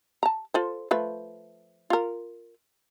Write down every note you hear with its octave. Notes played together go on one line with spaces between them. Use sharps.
A5 A#5
F4 A4 C5
F3 A3 B4
F4 A#4